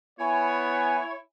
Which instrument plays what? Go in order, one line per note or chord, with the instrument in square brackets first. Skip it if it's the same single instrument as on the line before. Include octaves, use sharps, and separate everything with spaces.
[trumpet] B3 [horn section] E4 C#5 [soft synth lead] G#5